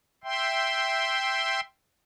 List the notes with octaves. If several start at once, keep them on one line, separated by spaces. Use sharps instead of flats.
E5 G5 C6